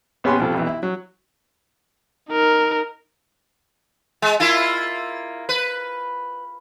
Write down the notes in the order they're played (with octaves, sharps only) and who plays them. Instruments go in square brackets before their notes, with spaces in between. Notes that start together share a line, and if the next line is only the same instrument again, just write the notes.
[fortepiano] A#1 B3 C#4 G4 G#5 C6
C2 F3 A4
B1 E3
E4
F#3
[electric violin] D#4 A#4
[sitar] G#3
A#3 E4 F4
B4